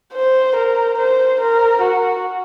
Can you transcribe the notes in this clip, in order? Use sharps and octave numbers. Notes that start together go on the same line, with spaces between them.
C5
A#4
C5
A#4
F#4